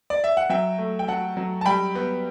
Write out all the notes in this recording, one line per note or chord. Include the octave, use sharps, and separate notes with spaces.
D5
E5
F#5
F#3 E5 G5
A3
G5
F#3 F#5 A5
F#3
A5
G3 G5 B5
B3